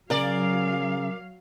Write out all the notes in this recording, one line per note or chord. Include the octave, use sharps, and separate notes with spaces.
C#3 F#3 A#4 D5 F5